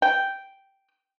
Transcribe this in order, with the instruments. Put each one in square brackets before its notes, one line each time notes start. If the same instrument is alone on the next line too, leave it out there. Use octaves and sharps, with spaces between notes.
[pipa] G5